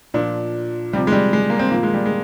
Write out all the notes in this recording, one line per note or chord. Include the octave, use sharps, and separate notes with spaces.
A#2 F3 D4
C3 F3 G3
G#3
G3
G#3
A#3
C4
A#2 F3 A#3
G#3
G3
G#3